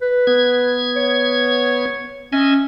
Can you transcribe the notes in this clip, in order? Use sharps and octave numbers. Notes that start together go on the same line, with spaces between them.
B4
B3 G#6
C#5
C#4 D#5 E5 G#5